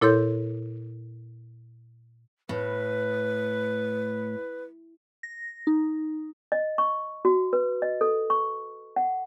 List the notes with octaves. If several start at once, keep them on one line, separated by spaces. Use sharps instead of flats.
A#2 E4 A4 C#5 C6 G6
A2 B4
A#6
D#4
D#5
C#6
F#4
B4
D#5
A4
C#6
F#5